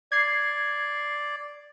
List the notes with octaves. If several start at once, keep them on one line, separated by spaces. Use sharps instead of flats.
D5 G#6 C7